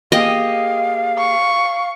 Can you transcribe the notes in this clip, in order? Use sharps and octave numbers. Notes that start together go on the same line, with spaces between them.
A#3 G4 G#4 D#5 F5
C#6